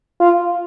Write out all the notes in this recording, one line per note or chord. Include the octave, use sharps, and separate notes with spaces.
F4